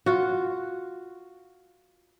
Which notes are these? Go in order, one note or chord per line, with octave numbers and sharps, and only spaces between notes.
F4 F#4